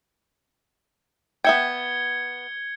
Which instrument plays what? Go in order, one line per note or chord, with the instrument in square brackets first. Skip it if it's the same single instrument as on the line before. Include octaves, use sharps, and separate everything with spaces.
[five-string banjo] B3 E5 G5 [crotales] G#6 C#7 G7